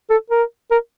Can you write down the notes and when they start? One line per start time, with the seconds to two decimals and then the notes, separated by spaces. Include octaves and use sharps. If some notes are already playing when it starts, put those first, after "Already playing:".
0.10 A4
0.30 A#4
0.71 A#4